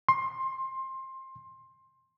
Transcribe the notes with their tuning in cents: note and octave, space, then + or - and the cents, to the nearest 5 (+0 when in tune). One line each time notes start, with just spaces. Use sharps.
C6 +20